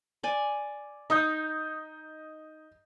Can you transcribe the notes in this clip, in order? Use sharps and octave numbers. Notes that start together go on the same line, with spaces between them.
D5 G#5
D#4 D#5 D#6 G6